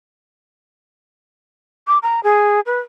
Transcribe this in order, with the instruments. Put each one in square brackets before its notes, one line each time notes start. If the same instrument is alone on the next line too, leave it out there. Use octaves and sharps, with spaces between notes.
[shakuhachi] D6
A#5
G#4
B4